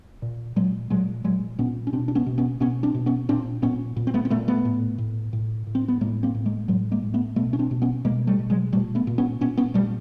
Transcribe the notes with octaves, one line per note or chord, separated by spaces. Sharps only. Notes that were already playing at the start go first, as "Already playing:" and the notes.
A#2
A#2 F#3 G#3
A#2 F#3 G#3
A#2 F#3 G#3
A#2 B3 C#4
C#4
B2 C4 D4
D4
B3 C#4
B2
B3 C#4
B2 B3 C#4
C4 D4
B2
B3 C#4
A#2 C4 D4
A#2 B3 C#4
A#2
C4
A3 B3
C4
A#2 A3 B3
A3 B3
A2
A2
A2
A2
C4
B3
A2 G#3 A#3
A#3 C4
A2
G#3 A#3
A2 F#3 G#3
G#3 A#3
A2
A3 B3
B2 A3 B3
C#4
C4 D4
B2
B3 C#4
B2 G#3 A#3
G3 A3
B2
F#3 G#3
A#2 G3 A3
A3 B3
A#2
B3 C#4
A#2 B3 C#4
B3 C#4
A#2 G3 A3